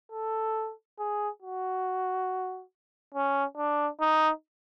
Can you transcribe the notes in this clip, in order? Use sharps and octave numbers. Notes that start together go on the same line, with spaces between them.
A4
G#4
F#4
C#4
D4
D#4